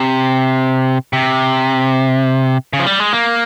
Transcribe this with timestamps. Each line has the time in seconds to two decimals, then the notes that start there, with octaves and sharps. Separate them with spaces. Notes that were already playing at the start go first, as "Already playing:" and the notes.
Already playing: C3
1.13 C3
2.73 C#3
2.79 F3
2.86 G3
3.00 G#3
3.13 A#3